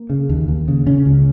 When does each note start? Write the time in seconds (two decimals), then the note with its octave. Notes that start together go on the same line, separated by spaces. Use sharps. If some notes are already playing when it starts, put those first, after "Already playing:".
Already playing: A#3
0.10 C#3
0.29 D#2
0.48 D#2
0.68 C#3
0.86 C#3 C#4
1.06 C#2